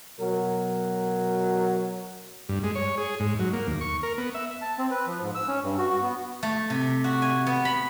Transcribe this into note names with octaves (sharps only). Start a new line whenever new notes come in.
B2 F#3 A#4
G2
G#3
C#5
G#4
G#2
F#3
A#3
D#2
C#6
A#4
B3
E5
A5
C4
B4
F3
G#2
E6
C#4
G2
F#4
F#4
B3
A3
C3
F#4
G#5
B3
B5